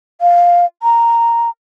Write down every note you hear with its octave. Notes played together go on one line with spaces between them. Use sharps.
F5
A#5